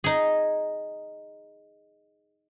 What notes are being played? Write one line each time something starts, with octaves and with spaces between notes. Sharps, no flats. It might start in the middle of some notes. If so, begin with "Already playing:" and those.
D#4 G#4